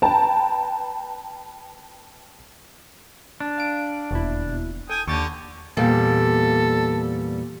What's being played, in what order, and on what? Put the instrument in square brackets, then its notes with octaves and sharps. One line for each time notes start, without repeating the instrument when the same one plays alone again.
[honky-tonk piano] B4 G5 A5 A#5
[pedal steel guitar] D4
[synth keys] F5 D7
[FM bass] E1 [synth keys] D#2 B2 E4
[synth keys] A4 [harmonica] G5 G#5 D#6
[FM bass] D#2 [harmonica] D3 G4 [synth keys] C#6 D6 A6
[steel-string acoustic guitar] E2 A#2 G3 [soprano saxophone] A4